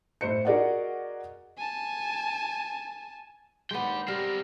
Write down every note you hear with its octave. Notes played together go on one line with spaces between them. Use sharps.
A2 C5 C#7
F#4 G#4 A#4 D5 D#5 F#5
G#5 A5
D#2 G#3 B3 D4 G5
G3 C4 G4 A#4 F6